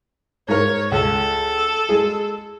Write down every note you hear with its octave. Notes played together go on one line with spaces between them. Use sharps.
G#2 A#4 C#5
C#2 A4
G#3 G#4